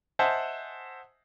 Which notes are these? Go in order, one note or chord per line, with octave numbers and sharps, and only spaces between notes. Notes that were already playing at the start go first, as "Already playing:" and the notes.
C5 D#5 E5 F#5 G#5 A5